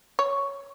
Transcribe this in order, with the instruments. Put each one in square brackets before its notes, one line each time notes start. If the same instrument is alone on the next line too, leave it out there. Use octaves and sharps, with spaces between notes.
[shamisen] C#5